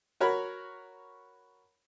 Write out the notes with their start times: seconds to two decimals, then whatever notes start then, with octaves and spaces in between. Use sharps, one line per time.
0.20 F#4 A#4 C#5 B5